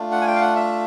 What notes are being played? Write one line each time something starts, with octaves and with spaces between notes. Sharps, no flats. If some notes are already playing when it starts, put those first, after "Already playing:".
Already playing: A3 D4 F4
F#5
G#5
G5
F5
F#5
E5